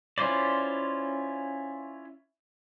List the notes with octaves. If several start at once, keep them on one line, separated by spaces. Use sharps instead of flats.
C#4 E4 F4 C5 D5